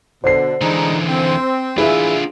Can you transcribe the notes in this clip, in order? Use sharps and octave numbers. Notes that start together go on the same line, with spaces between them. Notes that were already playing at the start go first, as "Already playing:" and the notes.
B2 D3 C5 C7
D3 E3 G#3 D4 D#4
C4
E3 D4 E4 F4 G#4